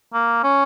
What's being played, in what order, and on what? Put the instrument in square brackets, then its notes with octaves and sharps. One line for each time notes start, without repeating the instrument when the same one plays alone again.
[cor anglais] A#3
C#4